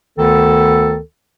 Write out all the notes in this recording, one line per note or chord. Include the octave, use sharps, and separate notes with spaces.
D2 D#3 B3 A4